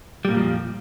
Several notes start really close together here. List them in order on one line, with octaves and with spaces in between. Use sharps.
G3 A#2 F2 F3